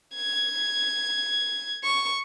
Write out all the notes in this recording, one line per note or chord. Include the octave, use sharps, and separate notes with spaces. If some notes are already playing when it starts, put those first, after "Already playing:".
G#6
C#6